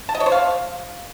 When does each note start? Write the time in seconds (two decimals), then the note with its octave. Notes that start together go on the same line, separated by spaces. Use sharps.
0.09 A5
0.15 D#5
0.20 C#5
0.26 C5
0.32 F5